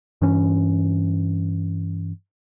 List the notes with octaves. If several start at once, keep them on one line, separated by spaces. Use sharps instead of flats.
G2 E3 C#4